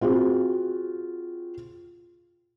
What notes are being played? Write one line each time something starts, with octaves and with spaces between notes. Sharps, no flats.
C4 F4 F#4 G#4